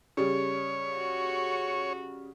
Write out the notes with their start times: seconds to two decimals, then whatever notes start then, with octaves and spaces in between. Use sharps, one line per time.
0.17 C#3 G3 C#5
0.97 F#4